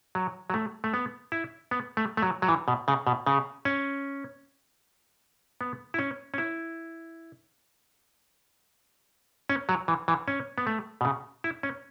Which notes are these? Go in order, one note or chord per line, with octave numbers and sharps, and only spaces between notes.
F#3
F#3
A3
A3
B3
E4
B3
A3
A3
F#3
F#3
E3
B2
C#3
B2
C#3
C#4
B3
E4
C#4
C#4
E4
C#4
F#3
E3
E3
C#4
B3
A3
B2
C#3
E4
C#4